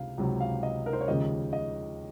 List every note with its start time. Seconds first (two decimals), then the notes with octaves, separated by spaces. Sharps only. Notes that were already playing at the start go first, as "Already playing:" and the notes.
Already playing: C#2 C3 F5
0.18 C#2 C3 F#3
0.40 F5
0.63 D#5
0.86 A#4
0.93 C5
1.01 C#5
1.08 D#2 C#3 F3 G#3 C#4 D#5
1.53 D#5